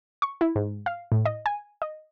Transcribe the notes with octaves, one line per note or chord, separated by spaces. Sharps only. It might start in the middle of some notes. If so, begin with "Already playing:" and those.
C#6
E4
G#2
F5
A2
D#5
G#5
D#5